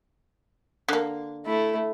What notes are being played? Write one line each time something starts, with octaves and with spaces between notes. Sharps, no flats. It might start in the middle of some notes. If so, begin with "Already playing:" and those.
D3 A#3
A3 E4